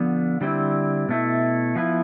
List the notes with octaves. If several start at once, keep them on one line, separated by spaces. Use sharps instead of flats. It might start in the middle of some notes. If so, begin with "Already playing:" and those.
Already playing: D3 F3 B3
D3 G3 C4 E4
B2 A3 E4
F3 B3 E4